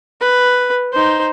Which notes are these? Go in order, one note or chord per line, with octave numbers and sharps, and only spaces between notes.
B4
D#4 C5